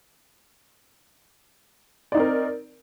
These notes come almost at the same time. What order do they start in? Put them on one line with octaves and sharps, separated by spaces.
D5 D#4 C4 A#4